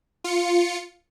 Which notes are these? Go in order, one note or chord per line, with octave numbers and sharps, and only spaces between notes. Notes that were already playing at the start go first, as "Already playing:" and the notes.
F4 C#7